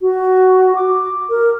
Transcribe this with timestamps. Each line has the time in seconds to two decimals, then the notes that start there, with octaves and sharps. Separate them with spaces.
0.01 F#4
0.76 D6
1.30 A#4